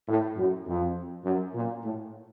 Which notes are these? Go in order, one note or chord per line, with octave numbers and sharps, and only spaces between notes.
A2
F#2
F2
F#2
A#2
A2